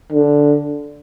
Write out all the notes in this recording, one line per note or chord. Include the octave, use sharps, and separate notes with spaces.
D3